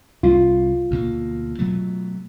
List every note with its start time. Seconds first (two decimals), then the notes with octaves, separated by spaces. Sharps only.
0.23 C2 F4
0.91 D2 B2 A#3
1.59 B2 F#3 A3